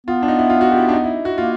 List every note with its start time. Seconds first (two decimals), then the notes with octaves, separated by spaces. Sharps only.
0.07 B3 F4
0.23 D4
0.28 D#4
0.39 E4
0.50 F4
0.61 F#4
0.72 G4
0.77 E4
0.82 F4
0.89 D4
0.93 D#4
1.04 E4
1.25 F#4
1.35 A#3 F4